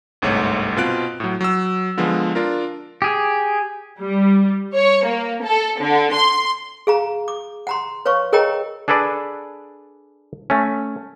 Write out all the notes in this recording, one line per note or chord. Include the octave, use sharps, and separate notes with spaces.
G1 C2 G#2 A3 C#5
B2 C4 F4 F5 F#6 D7
A2 F#3
F#3 E6
D3 F3 G#3 B3
D4 F4 A#4
G4 G#4
G3
C#5
A#3
A4
D3
C6
G#4 F5 A#5
D6
F#5 A#5 C6
B4 C#5 F5 C#6
G#4 A#4 C#5 D#5 G5 A#5
D4 G#4 A4 B4 D5
A3 C#4